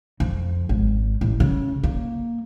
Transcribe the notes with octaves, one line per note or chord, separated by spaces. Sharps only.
F2
G#1
A1
C#3
A#3